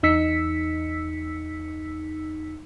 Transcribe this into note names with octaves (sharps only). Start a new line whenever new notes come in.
E2 D#4 E6 B6 C#7